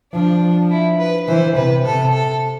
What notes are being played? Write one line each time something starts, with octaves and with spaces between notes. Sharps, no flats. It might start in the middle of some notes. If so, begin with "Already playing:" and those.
F3 D4
E4
B4
E3 C5
C3 B4
C3 A4
A4